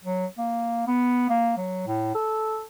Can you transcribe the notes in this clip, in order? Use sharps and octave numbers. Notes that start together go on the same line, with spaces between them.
F#3
A#3
B3
A#3
F#3
A2
A4